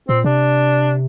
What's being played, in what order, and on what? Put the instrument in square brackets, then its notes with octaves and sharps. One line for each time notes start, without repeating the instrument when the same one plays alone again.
[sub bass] A#2 [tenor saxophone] C4
[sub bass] C3 [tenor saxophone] D4